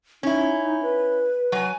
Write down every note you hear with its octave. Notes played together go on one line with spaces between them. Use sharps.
C#4 D#4 E4
B4
F#3 G#5